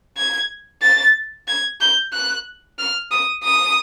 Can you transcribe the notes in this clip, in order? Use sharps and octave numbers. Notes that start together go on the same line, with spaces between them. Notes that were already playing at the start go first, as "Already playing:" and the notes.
G#6
A6
G#6
G6
F#6
F6
D#6
D#6